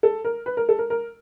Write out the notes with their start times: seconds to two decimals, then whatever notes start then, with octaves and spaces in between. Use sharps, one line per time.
0.03 A4
0.25 A#4
0.46 B4
0.57 A#4
0.69 A4
0.79 A#4
0.90 A#4